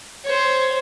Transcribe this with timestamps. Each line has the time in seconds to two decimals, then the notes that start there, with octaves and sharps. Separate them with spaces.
0.25 C5 C#5